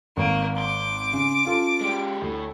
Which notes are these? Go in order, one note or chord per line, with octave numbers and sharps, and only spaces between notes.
G#1 A#3 C#6 D7
C6 D6
C#3
C#4 F4 A4
G#3 G4
D2 A2 A3